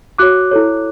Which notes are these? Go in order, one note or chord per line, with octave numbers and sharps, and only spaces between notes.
F#4 C#5 D6 F#6
E4 A4 C#5